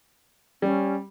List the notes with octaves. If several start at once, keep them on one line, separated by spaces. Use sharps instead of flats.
G3 C#4